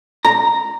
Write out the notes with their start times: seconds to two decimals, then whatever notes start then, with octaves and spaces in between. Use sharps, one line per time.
0.25 A#5